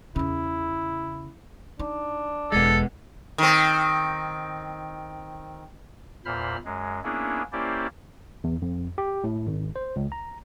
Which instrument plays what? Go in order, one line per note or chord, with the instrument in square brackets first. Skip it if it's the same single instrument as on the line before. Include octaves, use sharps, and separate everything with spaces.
[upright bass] E2 C#3 [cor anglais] E4
[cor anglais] D4 [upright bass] D#4
[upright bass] E1 E2 [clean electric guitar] G#3 B3 [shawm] A4
[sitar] D#3 C4
[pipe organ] E2 A#2 C5 B5 F6
F#2 G#3
A#3 B3 C#4 D4 E4 G#4
A#3 C#4 E4 G4 C5 D5
[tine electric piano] E2
F2
G4
A2
G#1
C5
C#2
A#5